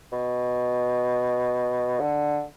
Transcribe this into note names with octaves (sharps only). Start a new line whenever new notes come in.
B2
D3